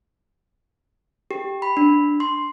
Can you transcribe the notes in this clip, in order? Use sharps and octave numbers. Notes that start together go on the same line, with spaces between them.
G4
B5
D4
C6